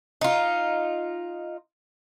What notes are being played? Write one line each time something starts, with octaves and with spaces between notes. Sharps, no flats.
D#4 F4